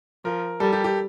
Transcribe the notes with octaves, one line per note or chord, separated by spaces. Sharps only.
F3 A#4
G3 A4
G4
G4